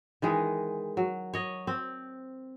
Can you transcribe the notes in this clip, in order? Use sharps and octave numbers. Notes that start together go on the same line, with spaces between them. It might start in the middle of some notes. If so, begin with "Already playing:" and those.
D#3 E3 G#3
F#3
C#5 D#5
C4